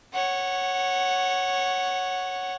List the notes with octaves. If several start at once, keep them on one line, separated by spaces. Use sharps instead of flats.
C#5 F#5